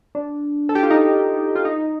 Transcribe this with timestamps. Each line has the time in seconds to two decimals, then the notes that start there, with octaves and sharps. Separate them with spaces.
0.15 D4
0.69 A4
0.75 G4
0.83 F4
0.91 D#4
1.56 F4
1.65 D#4